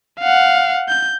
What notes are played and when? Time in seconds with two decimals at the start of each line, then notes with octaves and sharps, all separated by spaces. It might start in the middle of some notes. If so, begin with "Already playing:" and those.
0.20 F5 F#5
0.88 G6